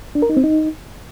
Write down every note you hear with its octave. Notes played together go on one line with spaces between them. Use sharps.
D4
A#4
D#4
C4
D#4